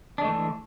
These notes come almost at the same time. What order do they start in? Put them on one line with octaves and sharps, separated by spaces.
D4 G#3 A3 E3 D3